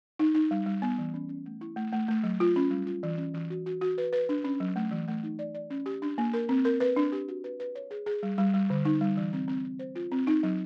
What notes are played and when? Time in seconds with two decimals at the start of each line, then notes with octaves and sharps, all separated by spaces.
0.19 D#4
0.35 D#4
0.51 G3
0.66 G3
0.82 B3
0.98 E3
1.14 C#4
1.29 C#4
1.46 A3
1.61 E4
1.76 A3
1.93 A3
2.08 A3
2.23 F#3
2.40 F4
2.56 C#4
2.71 G3
2.87 F4
3.03 E3
3.18 C#4
3.34 E3
3.50 F#4
3.66 F#4
3.81 F#4
3.98 B4
4.13 B4
4.29 D4
4.44 C#4
4.60 F#3
4.76 A3
4.91 E3
5.08 A3
5.23 D#4
5.39 D5
5.54 D5
5.70 C#4
5.86 G4
6.02 D4
6.18 A#3
6.34 A#4
6.49 C4
6.65 A#4
6.80 B4
6.96 D4
7.12 G4
7.28 F#4
7.44 B4
7.60 B4
7.75 C#5
7.91 G#4
8.06 G#4
8.23 G3
8.38 G3
8.54 G3
8.70 D3
8.85 D#4
9.01 G3
9.17 E3
9.33 C4
9.48 C4
9.65 C4
9.79 C5
9.95 F4
10.12 C4
10.27 D#4
10.43 F#3